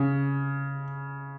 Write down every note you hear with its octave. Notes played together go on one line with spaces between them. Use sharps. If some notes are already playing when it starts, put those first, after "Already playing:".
Already playing: C#3